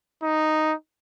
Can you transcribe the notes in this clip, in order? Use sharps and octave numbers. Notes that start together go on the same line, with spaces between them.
D#4